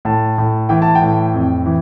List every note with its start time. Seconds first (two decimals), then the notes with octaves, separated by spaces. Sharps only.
0.05 A2 A5
0.38 A2
0.69 E3 G5
0.82 A5
0.95 G5
1.02 A2
1.34 F2
1.66 E3